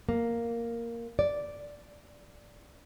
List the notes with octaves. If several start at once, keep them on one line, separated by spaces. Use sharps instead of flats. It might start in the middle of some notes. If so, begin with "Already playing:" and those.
A#3
D5